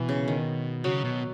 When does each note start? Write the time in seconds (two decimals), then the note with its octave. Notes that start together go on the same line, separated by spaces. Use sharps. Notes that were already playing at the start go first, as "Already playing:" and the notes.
Already playing: B2 E3
0.09 C#3
0.28 D#3
0.84 C#3 F#3
1.04 B2